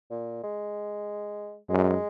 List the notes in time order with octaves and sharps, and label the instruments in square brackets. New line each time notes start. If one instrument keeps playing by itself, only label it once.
[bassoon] A#2
G#3
[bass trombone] F#2 [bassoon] G#3